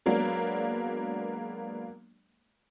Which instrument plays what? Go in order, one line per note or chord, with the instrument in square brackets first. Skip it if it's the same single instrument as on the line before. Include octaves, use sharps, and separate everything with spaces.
[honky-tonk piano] F#3 G#3 A#3 B3 D4